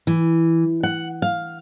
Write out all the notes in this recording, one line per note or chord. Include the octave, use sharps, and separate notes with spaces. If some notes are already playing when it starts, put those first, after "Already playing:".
E3
F#5
F5